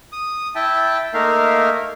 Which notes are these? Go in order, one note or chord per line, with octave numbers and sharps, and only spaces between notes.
D#6
E4 E5 G5 A5
A3 A#3 D#4 A#4 E5 F5